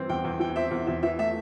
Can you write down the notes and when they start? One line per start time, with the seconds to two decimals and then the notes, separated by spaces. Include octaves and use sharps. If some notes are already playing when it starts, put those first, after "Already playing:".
Already playing: G2 E3 C4
0.09 E2 G5
0.24 E2
0.40 E3 G5
0.56 C4 E5
0.71 E2
0.87 E2 E5
1.03 E3 E5
1.19 A3 E5